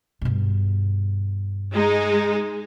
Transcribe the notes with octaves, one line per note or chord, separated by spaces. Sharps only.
G2 B2
G#3 D#4